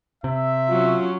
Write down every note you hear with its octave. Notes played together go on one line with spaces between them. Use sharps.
C3 E5
F#3 C#4 F4